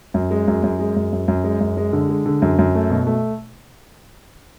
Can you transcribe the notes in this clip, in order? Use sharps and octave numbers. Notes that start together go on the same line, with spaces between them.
F#2
G#3
F#2
F#2
G#3
F#2
F#2
F#2
G#3
F#2
G#3
D3
G#3
D3
F#2
F#2
A3
B2
A3